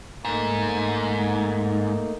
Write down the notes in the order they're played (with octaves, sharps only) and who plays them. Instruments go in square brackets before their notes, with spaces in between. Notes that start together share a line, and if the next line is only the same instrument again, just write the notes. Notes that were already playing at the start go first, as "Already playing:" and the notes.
[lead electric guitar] G#2 [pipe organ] A3 A#3 D#4